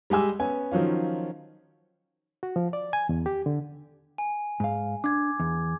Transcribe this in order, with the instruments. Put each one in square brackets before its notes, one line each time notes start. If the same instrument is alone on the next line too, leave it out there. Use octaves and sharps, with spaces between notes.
[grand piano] G3 G#3 G4 G#5 E6
B3 C#4 G#5
D#3 F3 F#3 C#4 F4
[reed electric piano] F#4
F3
D5
G#5
E2
G4
D3
[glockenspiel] G#5
[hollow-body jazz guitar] G#2 F5
[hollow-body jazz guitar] D4 [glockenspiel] D6 G#6
[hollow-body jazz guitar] E2